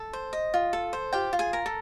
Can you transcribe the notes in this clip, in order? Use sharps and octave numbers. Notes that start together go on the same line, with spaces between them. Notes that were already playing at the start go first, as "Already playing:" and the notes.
Already playing: A4
C5
D#5
F4
A4
C5
F4 G4 G5
F4
G#4 G#5
A#4
A4